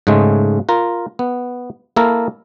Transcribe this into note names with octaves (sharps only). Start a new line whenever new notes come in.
G#2 C#3 G#3 A3
F4 A#4
B3
A#3 E4 A4 A#4